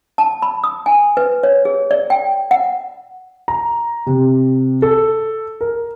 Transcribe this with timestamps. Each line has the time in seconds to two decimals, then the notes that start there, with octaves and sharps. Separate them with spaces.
0.18 A5
0.42 B5
0.64 D#6
0.86 G#5
1.17 B4
1.43 C#5
1.65 G#4
1.91 D5
2.10 G5
2.51 F#5
3.48 A#5
4.07 C3
4.82 A4
5.61 A#4